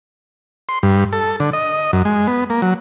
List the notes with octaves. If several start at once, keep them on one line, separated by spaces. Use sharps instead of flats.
C6
G2
A4
D3
D#5
F#2
G#3
B3
A#3
F#3